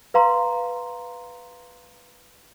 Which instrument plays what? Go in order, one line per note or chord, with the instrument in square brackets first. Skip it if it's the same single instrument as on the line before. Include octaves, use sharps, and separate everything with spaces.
[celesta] B4 F5 A#5 C6